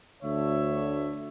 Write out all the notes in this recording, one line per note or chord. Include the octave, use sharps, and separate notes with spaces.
D2 D3 C#5 E5